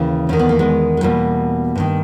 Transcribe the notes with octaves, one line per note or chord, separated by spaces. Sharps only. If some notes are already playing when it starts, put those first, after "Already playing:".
Already playing: D#2 C#3 E3
E2 D#3 C#4
B3
A#3
G#3 B3
G#3
E2 B2 G3 A#3
G2 D#3